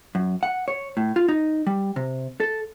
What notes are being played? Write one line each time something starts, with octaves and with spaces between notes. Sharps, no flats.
F#2
F#5
C#5
A2
F4
D#4
G3
C3
A4